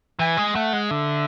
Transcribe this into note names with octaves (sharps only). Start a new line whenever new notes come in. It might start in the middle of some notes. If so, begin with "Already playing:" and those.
E3 G#5
G#3
A3 F#5
G#3
D3 E5